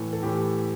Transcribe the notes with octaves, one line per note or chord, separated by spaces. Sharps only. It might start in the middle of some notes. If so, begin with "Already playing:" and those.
Already playing: A2 E3 A4
A4
A2 E3 G4